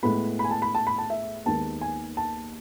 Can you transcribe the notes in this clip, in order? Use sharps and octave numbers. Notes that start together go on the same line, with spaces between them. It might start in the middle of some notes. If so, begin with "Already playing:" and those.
A2 G#3 B3 B5
B5
G#5
A5
B5
A5
B5
A5
E5
D#2 D#3 G#3 B3 A5
G#5
A5